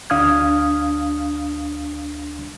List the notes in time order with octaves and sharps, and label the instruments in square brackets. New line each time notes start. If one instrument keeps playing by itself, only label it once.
[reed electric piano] D2 D4 F5 D#6 F6 G#6